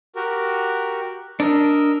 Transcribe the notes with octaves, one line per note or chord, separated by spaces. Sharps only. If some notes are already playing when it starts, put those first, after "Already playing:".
F#4 G4 A#4
D4 A#4 D#5 E6